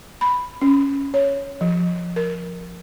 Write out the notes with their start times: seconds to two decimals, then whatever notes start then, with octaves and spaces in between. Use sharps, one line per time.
0.21 B5
0.61 C#4
1.14 C#5
1.61 F3
2.16 A#4